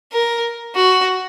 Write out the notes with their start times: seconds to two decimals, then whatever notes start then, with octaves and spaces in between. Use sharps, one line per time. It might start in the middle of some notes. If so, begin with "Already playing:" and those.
0.12 A#4
0.75 F#4